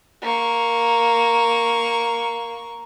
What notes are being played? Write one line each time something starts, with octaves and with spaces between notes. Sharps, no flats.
A#3 C#6